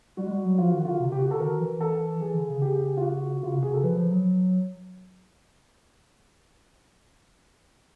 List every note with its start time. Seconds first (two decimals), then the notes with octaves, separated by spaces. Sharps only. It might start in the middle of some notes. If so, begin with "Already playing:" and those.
0.17 G3 F#4
0.26 G#3
0.31 G3
0.44 F#3
0.58 F3 F4
0.71 D#3 F#4
0.85 D3 F4
0.98 C3
1.12 C#3 G4
1.19 F#4
1.26 D3
1.31 A4
1.39 D#3 A#4
1.60 E3
1.81 A4
2.21 E3 G#4
2.34 D3
2.48 C#3
2.62 G4
2.68 G#4
2.75 G4
2.97 F4
3.02 F#4
3.42 C#3 F4
3.52 C3 F#4
3.63 G#4
3.69 C#3 A4
3.83 F3 B4
3.96 F3
4.10 F#3